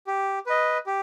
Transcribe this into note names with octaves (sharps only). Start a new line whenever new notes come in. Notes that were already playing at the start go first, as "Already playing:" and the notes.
G4
B4 D#5
G4